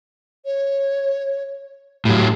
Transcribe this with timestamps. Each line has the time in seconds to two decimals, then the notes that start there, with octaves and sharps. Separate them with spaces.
0.45 C#5
2.05 A2 F#3 G4